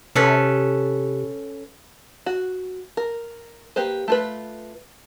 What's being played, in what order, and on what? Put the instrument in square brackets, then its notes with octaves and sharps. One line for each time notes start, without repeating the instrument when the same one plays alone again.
[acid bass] C3 [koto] C#4 A4 B4
[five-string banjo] F#4
A#4
A#3 G4 B4 C5
A3 F4 B4